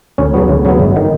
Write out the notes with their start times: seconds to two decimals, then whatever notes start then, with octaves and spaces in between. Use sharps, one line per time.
0.18 D2 C#4
0.34 C#3 F#3 B3
0.49 D2
0.65 C#3 F#3 B3
0.79 G1
0.96 D#3